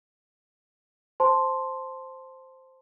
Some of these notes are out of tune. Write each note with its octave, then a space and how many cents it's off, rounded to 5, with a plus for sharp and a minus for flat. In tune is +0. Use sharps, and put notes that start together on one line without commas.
C5 +0 A5 +0 C6 +0